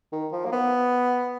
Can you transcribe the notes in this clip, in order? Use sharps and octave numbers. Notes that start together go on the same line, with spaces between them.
D#3
F3
A#3
B3